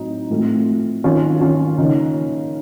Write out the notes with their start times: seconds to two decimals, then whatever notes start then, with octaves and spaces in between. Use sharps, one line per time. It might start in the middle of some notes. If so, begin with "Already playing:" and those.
Already playing: A2 F#3 C4 D#4
0.30 A2 F3 A3 C4
1.04 D#3 F#3 A#3 C#4 F4
1.41 C#4 F4
1.78 C#3 F3 A#3 D#4